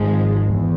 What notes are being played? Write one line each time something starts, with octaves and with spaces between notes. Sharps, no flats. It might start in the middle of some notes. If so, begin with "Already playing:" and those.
Already playing: G#1 G#2 F3 G#3
E2